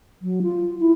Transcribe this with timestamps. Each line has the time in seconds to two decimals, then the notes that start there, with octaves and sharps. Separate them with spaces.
0.22 F#3
0.43 F4
0.80 E4